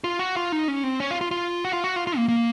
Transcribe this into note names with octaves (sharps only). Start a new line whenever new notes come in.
F4
F#4
F4
D#4
C#4
C4
C#4
F4
F4
F4
F#4
F4
F#4
F4
F4
A#3
A#3